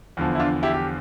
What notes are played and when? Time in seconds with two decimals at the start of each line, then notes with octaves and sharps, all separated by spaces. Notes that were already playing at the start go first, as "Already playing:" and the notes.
0.17 E2 D3 F3
0.35 E4
0.39 D4 F4
0.63 E4 G4
0.74 G4